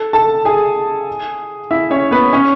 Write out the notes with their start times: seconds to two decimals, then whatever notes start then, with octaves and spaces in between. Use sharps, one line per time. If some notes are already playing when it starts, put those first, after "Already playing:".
Already playing: A4
0.13 A4 A5
0.45 G#4 G#5
1.71 E4 E5
1.90 C#4 C#5
2.11 B3 B4
2.33 C#4 C#5